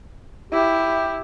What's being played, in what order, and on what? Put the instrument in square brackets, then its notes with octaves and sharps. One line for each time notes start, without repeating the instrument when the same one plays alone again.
[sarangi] E4 [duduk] G4